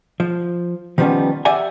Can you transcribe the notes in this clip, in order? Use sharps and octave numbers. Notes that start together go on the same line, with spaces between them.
F3
D#3 F3 G3 A#3 B3 C#4
G4 D5 E5 F#5 G#5